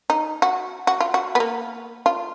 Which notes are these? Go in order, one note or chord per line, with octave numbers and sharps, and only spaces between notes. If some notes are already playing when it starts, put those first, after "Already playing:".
D#4
F#4
F#4
F4
F#4
B3
A#3
F4